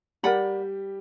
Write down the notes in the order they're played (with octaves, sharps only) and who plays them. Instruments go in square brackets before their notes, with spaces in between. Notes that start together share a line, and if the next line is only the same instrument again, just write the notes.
[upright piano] G3 G4 [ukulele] A#4 D5 F#5 B5